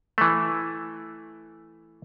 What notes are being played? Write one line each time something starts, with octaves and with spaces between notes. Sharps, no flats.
E3 A3